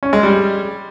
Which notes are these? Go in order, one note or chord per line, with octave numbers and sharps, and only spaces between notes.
C#4
G#3
G3